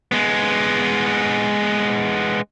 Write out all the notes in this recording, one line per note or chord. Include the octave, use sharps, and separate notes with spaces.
G#3 B3